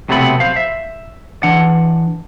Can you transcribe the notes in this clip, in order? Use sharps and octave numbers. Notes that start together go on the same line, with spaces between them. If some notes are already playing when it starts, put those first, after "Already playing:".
B1 C3 F#3 A3 B3 B5
C5 F5
E5
E3 D4 F#5